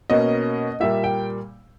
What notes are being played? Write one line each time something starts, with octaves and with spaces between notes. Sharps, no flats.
B2 A#3 C#4 D#5
A#2 G3 A#3 E5
G5